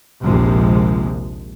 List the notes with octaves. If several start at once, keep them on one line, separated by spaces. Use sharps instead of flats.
A#1 D#2 C3 F3 G#3